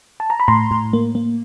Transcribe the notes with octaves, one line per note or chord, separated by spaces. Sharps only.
A5
A#5
B5
A2 A#5 C6
A2
A#3
A#3